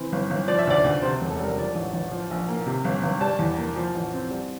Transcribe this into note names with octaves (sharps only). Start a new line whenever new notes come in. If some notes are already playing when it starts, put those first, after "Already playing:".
Already playing: E3 C4
G1
G1
F3 D5
E5
D2 D5
D2
C3 C5
E1
A4
G3 A#4
F3 D5
A1
A1
F3
A#1
A#3
C3
G1
G1
G3 A5
E2
A#3
F3
A1
C4
G3